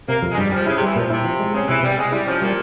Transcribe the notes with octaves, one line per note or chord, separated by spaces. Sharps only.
C3 A#3
F2
G#3
G2 G3
F3 G3
C#3 E4
C3
E3 G3
A#2 F3
C3 E4
F3
G#3
C#3 C4
C3 E3
C3 G3
G#3 C4
G3 E4
F3 C#4
A#2 G3